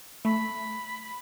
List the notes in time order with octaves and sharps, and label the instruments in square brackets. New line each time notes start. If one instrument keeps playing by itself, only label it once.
[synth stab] A3 [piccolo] B5